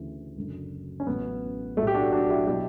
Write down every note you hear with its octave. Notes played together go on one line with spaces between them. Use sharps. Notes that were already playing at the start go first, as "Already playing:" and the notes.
Already playing: D2 C#3 E3
F#1 F#2 D3
C#4
A1 A2 F#3 B3
B1 A2 F#3 A3
G4
D4 F#4
D4 F#4
E4 G4
B2 F#3 E4 G4